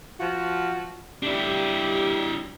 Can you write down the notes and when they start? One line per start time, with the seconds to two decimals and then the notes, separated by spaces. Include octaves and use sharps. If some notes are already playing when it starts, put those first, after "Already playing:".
0.19 F3 F#4
1.23 G3 D4 E4 G4